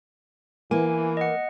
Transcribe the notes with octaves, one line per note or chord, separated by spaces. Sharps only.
E3 A#3 G#5
D#5 F#5